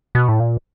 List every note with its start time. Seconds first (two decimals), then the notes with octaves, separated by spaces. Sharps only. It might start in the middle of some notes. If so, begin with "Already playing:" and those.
0.15 B2
0.28 A2
0.40 A#2